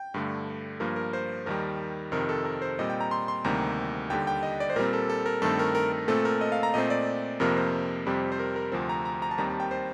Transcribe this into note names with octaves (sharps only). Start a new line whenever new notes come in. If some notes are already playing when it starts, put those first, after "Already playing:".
Already playing: G5
G2 D3 A3
G2 F3 A#3 A#4
A#4
C5
D#2 D#3 G3 A#4
F2 C3 D#3 A#4
A4
A#4
C5
A#2 G3 C4 D#5
G5
A#5
C6
C6
D2 C3 D#3 G3 A#3 A#5
D#2 D3 G3 G5
G5
D#5
D5
C5
A#2 G3 C4 A#4
A4
A4
A#4
G2 D#3 A3 C4 A4
A#4
A#4
A#4
A#2 A3 C4 A4
A#4
D#5
F5
A#5
A#2 A3 C4 D#5
D5
F2 C3 F3 A#3 A#4
C5
F2 C3 G3 C4
C5
A#4
A#4
D2 C3 F3 C4
A#5
A#5
A#5
A5
D#2 D#3 G3 C4 A#5
A5
G5
C5